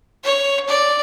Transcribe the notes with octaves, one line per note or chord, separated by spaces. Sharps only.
C#5
D5